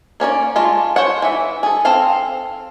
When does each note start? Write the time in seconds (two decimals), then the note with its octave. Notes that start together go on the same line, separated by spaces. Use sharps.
0.20 A#3 C#4 D4 D5
0.56 G#3 A3 F4
0.96 C5 C#5 F#5
1.22 E3 E5
1.63 G#4 A4
1.85 C4 A4 F5